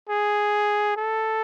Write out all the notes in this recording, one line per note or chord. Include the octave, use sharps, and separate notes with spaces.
G#4
A4